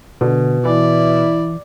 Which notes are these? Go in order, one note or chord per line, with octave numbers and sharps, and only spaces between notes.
B2 D3
E3 E4 D5